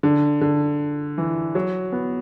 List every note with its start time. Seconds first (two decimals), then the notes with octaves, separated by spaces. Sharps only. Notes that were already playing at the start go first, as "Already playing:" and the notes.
0.03 D3
0.41 D3
1.18 E3
1.55 F#3
1.92 B3